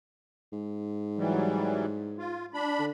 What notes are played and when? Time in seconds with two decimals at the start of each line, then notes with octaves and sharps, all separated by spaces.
0.53 G#2
1.18 E3 F#3 G3
2.18 F4
2.54 D4 B5
2.79 D3